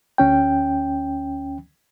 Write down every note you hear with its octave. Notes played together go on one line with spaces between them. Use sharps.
D2 C#4 G5